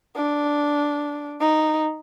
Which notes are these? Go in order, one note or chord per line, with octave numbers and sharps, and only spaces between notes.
D4
D#4